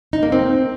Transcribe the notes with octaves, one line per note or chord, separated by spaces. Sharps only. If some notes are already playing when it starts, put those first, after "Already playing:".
D#4
A#3
C4